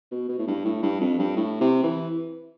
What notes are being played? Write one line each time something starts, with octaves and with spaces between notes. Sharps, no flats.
B2
B2
A2
G2
A2
G2
F2
G2
A2
C3
E3